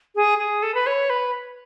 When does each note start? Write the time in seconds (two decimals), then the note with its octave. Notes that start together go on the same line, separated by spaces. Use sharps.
0.15 G#4
0.39 G#4
0.63 A4
0.74 B4
0.86 C#5
1.10 B4